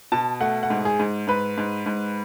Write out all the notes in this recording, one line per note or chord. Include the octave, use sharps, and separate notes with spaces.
B2 A5
A3 F#5
F#5
G#2
G#4
G#2
G#2 B4
G#2
G#2